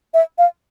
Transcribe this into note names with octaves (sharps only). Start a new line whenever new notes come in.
E5
F5